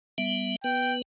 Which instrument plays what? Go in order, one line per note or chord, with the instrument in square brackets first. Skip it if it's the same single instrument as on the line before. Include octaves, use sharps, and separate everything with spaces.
[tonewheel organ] G3 B3 E5
[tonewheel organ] B3 B4 [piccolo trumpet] G5